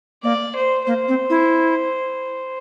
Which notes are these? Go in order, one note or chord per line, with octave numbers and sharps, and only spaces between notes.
A#3 D5
C5
A#3 C5
C4
E4